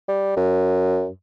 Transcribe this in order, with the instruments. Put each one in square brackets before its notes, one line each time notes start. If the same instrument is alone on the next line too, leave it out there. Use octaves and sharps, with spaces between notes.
[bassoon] G3
F#2